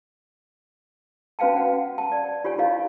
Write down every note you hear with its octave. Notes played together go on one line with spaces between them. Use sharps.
C#4 F#4 B4 F5 G5 A5
F#5
A5
D5
F4 G4 C#5 G#5
E4 F4 G4 D#5 F5